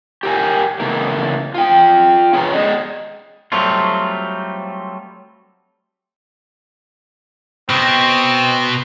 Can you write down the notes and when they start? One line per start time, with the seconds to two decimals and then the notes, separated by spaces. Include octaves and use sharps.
0.23 G4 A#4 G#5
0.80 C#3 E3 A3 A#3
1.54 F4 G5
2.33 C#4 G#4 B4 A#5
2.54 G#4 D5 D#5
3.52 F#3 G3 A3 C4 F4
7.70 B2 C4